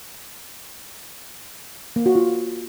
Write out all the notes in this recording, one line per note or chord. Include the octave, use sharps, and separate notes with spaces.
A#3
F#4
F4